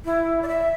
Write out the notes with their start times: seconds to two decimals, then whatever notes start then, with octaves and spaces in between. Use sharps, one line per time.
0.05 E4
0.42 D5
0.48 E5